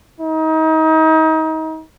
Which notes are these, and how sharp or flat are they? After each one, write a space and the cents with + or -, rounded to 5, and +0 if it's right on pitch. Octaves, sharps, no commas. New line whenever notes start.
D#4 +30